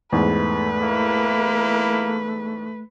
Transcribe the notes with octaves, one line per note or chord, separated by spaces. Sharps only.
E2 G#2 A3 B4
A#3 E4